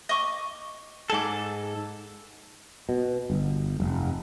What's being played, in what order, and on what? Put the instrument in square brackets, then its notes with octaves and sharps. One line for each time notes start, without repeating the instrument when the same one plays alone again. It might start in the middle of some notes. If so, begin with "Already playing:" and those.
[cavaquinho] D#5 C#6 D6
[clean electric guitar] G#2 A4 [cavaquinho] G#4 A5 D6
[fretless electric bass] B2
G1
F1